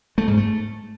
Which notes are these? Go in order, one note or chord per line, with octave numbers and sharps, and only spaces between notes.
A3
G#2
A3